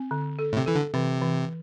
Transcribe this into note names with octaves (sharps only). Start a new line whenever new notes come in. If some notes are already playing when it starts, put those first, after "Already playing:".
Already playing: C4
D3
A4
A2
C3
E3 A4
D3
C3 E3
E3